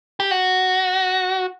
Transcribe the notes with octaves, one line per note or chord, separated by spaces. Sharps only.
G4
F#4